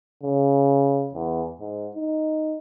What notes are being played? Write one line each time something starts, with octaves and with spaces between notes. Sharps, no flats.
C#3
E2
G#2
D#4